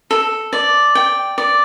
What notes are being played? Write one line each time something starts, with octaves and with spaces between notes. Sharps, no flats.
A4
D5
G5
D5